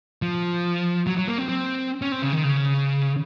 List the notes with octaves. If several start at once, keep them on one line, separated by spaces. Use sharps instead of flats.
F3
F#3
F#3
A#3
C4
C4
C#4
C4
C#3
D#3
C#3